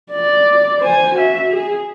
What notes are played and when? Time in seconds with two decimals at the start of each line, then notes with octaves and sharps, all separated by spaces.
0.11 D5
0.80 C5 G#5
1.15 F#4 E5
1.51 G#4